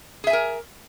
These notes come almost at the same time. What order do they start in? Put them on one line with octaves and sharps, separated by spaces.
G#4 E5 G#5 A#4